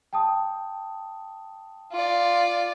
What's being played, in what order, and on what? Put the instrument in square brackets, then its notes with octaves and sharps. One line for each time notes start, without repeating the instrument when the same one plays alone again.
[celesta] G5 A5 D#6
[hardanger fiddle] F4 D5